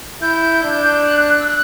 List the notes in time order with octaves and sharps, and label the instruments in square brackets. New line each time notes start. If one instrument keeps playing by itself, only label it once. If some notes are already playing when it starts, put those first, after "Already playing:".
[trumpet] E4 [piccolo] G6
[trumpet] D4
[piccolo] F#6
E6
F#6